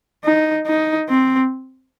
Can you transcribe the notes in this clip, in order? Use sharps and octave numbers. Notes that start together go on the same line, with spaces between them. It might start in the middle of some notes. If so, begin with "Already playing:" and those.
D#4
D#4
C4